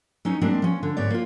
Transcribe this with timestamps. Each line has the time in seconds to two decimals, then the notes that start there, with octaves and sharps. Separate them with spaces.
0.25 F#3 C#4 D#4 C#5
0.41 G3 G#3 A#3 C4 D4
0.62 F3 C#4
0.83 D3
0.97 G#2 B3 C#5 D5
1.10 A#3 F4